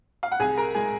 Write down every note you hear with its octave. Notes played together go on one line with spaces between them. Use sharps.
F5
F#5
C2 G#4 G#5
A#4 A#5
G#3 G#4 G#5